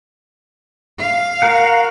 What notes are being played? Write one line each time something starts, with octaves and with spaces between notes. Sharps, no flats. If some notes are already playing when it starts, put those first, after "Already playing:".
F5
F#4 A#4 F#5